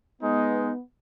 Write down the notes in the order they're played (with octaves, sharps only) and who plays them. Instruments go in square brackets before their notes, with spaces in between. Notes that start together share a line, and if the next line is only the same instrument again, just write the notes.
[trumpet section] G#3 D#4 [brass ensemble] B3